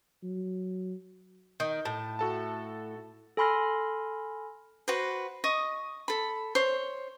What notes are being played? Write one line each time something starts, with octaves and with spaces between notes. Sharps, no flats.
F#3
D#3 G6
A2 A5
F#4 A4 A5
A4 G#5 B5 C6 F6 A#6
F#4 B4 C5
D#5 C#6 D#6
A4 B5
C5 C#5